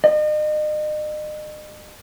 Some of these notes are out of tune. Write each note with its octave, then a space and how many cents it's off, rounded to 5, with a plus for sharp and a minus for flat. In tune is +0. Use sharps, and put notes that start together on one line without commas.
D#5 -40